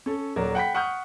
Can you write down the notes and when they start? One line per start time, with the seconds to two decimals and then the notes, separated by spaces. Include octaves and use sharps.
0.06 C#4 A4
0.36 D#1 F#3 A#4 D5
0.55 F#5 G5 B5 B6
0.75 F#5 C#6 D#6 F6 G6